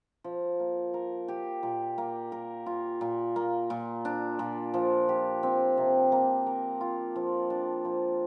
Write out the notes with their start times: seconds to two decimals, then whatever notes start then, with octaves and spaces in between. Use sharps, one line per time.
0.24 F3
0.60 A#3
0.94 A#4
1.28 G4
1.63 A#2
1.98 A#3
2.32 A#4
2.66 F4
3.01 A#2
3.36 A#3
3.70 A#2
4.05 D4
4.39 A#2
4.74 F3
5.09 G4
5.43 C4
5.77 C3
6.12 A#3
6.46 A#4
6.81 F4
7.16 F3
7.50 D4
7.85 F3